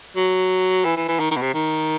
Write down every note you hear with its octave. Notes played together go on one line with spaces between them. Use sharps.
F#3
E3
E3
E3
D#3
D#3
B2
C3
D#3